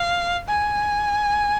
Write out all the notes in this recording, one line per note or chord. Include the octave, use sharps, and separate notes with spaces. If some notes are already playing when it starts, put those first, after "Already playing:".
Already playing: F5
G#5